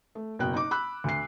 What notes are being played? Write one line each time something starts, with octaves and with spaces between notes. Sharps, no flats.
A3
F#1 B2 G5 F#6
D#4 D6
B5 E6 F#6
D2 C7